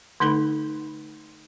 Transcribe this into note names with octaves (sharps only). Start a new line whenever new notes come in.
D3 A3 D#4 A4 B5